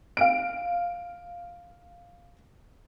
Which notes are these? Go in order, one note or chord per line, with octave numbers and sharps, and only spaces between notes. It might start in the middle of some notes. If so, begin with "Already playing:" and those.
F5 D7